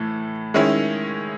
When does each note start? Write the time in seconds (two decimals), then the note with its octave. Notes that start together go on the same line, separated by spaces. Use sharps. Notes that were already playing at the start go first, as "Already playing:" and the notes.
Already playing: A2 E3 A3
0.54 D#3 G#3 C#4 E4